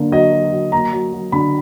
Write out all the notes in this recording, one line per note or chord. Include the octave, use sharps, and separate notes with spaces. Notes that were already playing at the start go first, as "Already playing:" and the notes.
Already playing: D3 F#3 A#3
F#3 D#5
F#3
F#3
A#3 A#5
F#3
F#3
D3 B5